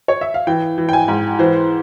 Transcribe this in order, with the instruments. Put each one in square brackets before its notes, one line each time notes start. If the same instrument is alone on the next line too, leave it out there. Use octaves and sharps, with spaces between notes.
[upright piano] C#5
E5
F5
E3 G5
E3
G5
G#5
G#2
E3 C5